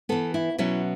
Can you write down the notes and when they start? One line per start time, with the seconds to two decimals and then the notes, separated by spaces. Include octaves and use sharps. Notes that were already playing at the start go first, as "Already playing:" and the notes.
0.09 E3 B3 A4
0.34 E4
0.58 B2 F#3 C#4 E4